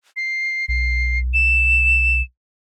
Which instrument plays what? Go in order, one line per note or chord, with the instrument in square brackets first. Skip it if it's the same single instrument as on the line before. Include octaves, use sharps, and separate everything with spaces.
[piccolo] C7
[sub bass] B1 [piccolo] C7
[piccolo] E7